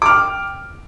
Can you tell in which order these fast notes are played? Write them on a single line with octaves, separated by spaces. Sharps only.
D6 F6 G5